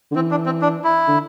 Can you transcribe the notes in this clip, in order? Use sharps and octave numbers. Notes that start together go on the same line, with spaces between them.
D3
E3 C4
D4
C4
D4
E4
D3